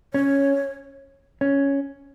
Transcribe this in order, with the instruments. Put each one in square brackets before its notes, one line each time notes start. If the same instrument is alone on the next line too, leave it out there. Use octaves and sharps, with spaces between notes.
[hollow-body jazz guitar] C#4 [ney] C#5
[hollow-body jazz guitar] C#4